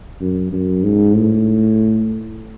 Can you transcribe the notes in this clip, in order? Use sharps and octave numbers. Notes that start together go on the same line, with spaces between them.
F#2
F#2
G#2
A2